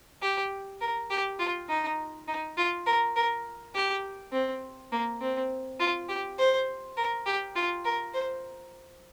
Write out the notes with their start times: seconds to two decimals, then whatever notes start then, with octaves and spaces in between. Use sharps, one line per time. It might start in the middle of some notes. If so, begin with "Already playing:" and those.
0.22 G4
0.81 A#4
1.10 G4
1.39 F4
1.69 D#4
2.28 D#4
2.57 F4
2.86 A#4
3.16 A#4
3.75 G4
4.32 C4
4.92 A#3
5.21 C4
5.80 F4
6.09 G4
6.38 C5
6.97 A#4
7.26 G4
7.56 F4
7.85 A#4
8.14 C5